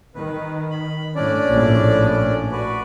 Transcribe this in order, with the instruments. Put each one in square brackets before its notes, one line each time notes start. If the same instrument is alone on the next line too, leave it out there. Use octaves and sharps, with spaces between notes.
[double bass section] D#3 [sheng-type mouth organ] B4
[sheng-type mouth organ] B5
[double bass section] A2 [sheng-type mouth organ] C#4 D4 D5
[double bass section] A#1 A2
[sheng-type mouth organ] F#4 B4 D5